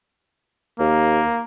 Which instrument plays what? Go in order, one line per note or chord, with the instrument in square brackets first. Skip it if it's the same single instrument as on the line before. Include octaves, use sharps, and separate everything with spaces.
[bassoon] D#2 [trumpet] A#3